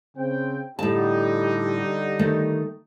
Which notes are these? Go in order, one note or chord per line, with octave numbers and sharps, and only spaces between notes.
C#3 C4 G5
A2 D3 G3 D#4 G4 A5
D#3 A3